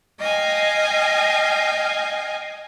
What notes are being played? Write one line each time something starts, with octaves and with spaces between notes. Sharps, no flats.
D#5 F5 G5 G#5